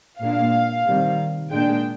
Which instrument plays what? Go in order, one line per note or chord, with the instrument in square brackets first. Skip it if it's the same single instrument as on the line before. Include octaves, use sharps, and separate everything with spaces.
[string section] A#2 G#3 D4 F5
C3 D#3 G3
A#2 G#3 D4 G5